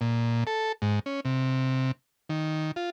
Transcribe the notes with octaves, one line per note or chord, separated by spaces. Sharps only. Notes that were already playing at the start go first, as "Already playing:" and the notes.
A#2
A4
G#2
C#4
C3
D#3
F4